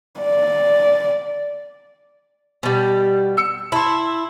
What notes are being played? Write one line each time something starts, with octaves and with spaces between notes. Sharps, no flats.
D5
B2 G3
E6 C#7
E4 A5 C6